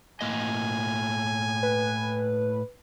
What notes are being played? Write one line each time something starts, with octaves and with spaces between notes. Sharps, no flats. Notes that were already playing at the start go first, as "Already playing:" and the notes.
A2 A#3 D#5 G#5
B4